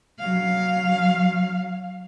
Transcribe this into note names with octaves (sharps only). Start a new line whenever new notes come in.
F#3 F5